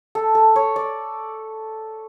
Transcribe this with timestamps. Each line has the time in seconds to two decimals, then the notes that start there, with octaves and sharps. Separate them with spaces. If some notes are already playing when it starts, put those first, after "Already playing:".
0.15 A4
0.35 A4
0.56 C#5
0.76 D5